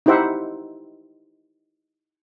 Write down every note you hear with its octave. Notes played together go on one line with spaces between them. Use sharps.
D#4 E4 G4 C5 E5 F#5